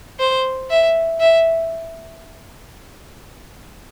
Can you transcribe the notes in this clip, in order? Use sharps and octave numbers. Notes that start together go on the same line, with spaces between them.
C5
E5
E5